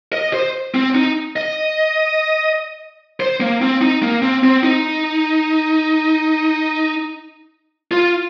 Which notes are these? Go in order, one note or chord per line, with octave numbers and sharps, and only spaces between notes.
D#5
C5
C4
D#4
D#5
C5
A#3
C4
D#4
A#3
C4
C4
D#4
F4